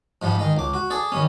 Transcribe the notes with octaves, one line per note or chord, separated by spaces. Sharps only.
G#2 F3 G3
D#3 G#3
C#2 D6
F#4
G#4 A4 D5
D#3 G3 C#4